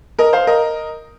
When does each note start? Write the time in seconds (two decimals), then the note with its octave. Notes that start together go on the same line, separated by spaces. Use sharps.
0.19 A#4 D#5
0.33 C5 F5
0.47 A#4 D#5